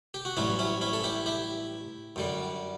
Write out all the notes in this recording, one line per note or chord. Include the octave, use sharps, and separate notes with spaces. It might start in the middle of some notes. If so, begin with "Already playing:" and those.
G4
F#4
A1 G2 F#3 C#4 E4
C#4 E4
C#4 E4
A4
E4 G4
E4 G4
F#2 D3 G3